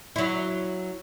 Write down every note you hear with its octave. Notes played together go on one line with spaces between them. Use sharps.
F#3 E4